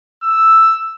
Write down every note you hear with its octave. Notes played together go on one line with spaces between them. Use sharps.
E6